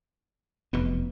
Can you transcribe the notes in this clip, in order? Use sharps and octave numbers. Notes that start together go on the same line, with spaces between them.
F1 E2 B2 B3